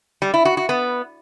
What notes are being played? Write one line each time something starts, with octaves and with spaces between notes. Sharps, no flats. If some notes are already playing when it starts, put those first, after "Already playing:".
G3
E4
F#4
F#4
B3